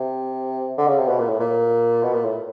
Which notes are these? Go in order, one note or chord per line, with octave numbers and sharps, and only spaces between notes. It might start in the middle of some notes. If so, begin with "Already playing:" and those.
Already playing: C3
D3
C#3
C3
B2
A#2
A2
A#2
B2
A#2
A2